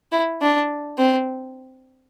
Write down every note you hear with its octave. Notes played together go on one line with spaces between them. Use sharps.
E4
D4
C4